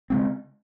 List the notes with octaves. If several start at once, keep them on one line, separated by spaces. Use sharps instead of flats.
C#3 G#3 C4